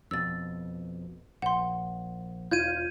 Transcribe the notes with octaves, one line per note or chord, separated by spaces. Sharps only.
F2 B2 E6 A6
A#1 F#5 C6
E1 F4 G6 G#6 D#7